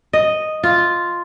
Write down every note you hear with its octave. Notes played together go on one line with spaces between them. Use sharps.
D#5
F4